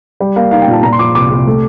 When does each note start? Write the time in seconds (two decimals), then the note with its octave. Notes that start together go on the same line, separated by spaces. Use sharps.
0.20 G3
0.36 A#3 F5
0.51 D#4 F5
0.62 G5
0.67 A#2
0.73 A5
0.83 A#2 A#5
0.92 C6
0.99 F3 D6
1.15 C2 D6
1.30 C2
1.47 A3